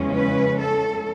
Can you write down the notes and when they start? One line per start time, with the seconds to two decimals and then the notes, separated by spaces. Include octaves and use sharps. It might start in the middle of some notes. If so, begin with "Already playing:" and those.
Already playing: E2 C#3 F3 G#3 C#4
0.15 B4
0.61 A4